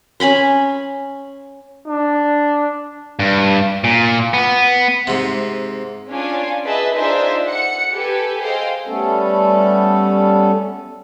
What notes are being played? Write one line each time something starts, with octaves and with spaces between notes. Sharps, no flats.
C#4 G#5 B5 C6
D4
G2
A#2
B3
G#2 C3
C#4 D4 F4 G#5
G#4 B4 D#5 E5 G#5 A5
D4 D#4 F4 G#4 C5 E5
F#5 C#7
G4 A4 B4 G#5
G#4 A4 C5 D#5 F5 G5
G3 A3 B3 C#4 A4